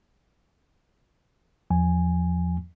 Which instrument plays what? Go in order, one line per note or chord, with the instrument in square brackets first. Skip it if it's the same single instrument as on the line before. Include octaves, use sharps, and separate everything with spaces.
[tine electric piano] E2 F3 G#5